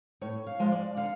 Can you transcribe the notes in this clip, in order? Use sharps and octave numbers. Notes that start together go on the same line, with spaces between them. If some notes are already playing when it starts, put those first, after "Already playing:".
A2 C#5
F5
F3 G#3
D5
D3 F5